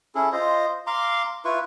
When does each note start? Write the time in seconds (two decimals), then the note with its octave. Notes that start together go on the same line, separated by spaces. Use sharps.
0.15 C#4 E4 G#4 A4
0.33 F4 C5 D#5
0.87 F5 A#5 C6 D6
1.45 E4 F4 B4 C#6